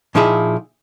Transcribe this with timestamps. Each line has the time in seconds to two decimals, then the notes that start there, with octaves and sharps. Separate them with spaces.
0.15 A#2 F3 D#4 E4 G#4